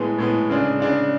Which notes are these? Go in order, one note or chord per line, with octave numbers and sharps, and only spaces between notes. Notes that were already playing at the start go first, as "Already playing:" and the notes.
Already playing: A2 G#3 B3
A2 G#3 B3
C#3 G#3 D4
C#3 G#3 D4